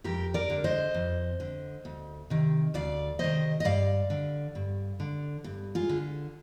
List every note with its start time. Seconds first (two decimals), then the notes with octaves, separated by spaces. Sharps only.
0.04 F2 G4 A#4
0.34 A#4 D5
0.50 D3
0.64 C5 D#5
0.94 F2
1.40 D3
1.85 D2
2.30 C3 D#3
2.74 D2 D5 F5
3.19 C3 D#3 C5 D#5
3.60 D#5
3.64 G2 D5 F5
4.10 D3
4.55 G2
5.00 D3
5.44 G2
5.75 F4 G#4
5.89 D3